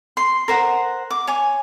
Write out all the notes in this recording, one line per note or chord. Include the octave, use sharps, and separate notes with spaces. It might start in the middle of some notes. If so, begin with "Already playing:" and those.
C6
A#4 C5 F#5
D6
C#5 G#5